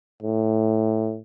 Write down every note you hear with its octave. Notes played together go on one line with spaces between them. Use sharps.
A2